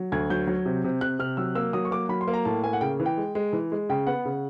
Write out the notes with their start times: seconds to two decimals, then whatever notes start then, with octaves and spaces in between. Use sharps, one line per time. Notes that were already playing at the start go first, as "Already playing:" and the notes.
Already playing: F#3
0.12 D2 G#6
0.30 F#3 G6
0.47 F#3
0.66 C3
0.84 C3
1.01 C3 F#6
1.19 C3 F6
1.37 F#3 E6
1.55 A#3 E6
1.73 F#3 D#6
1.85 C#6
1.91 A#3 D6
2.09 F#3 B5
2.21 C6
2.28 A#3
2.34 A#5
2.45 A2 A5
2.64 A#3 G#5
2.73 F#5
2.81 C#3 G5
3.00 E3
3.06 G5
3.17 G#3
3.35 G#3
3.53 E3
3.72 G#3
3.89 C#3 G5
4.07 B3 F#5
4.25 C#3